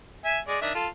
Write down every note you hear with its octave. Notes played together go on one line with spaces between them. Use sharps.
E5 G#5
G#3 D5
D#3 D4 E5
F4 A4